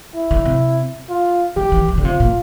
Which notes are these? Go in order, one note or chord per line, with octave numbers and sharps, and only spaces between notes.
E4
D3
C3
F4
D3 G4
E3
E3
D3
C3 F4
A#2